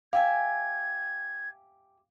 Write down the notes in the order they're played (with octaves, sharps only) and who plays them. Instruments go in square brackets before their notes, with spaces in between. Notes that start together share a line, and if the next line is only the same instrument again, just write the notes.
[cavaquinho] G4 E5 G#5 [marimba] F5 [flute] G#6